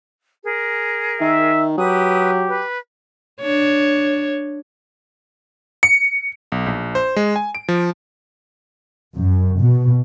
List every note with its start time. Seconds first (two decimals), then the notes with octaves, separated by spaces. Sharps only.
0.44 G#4 A#4
1.20 D#3 E5
1.77 F#3 G4 B4 D#6
2.48 B4
3.41 D4 C#5
5.83 C#7
6.52 B1
6.66 A#1
6.95 C5
7.16 G#3
7.36 G#5
7.55 D7
7.68 F3
9.15 F#2
9.60 B2